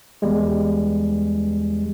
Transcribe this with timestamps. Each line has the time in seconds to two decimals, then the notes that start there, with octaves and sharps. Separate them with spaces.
0.22 E2 G3 G#3